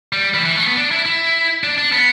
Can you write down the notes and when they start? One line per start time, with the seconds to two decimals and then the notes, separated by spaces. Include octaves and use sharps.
0.13 G3
0.34 E3
0.45 E3
0.56 A3
0.66 B3
0.77 D4
0.92 E4
1.06 E4
1.64 D4
1.78 D4
1.92 B3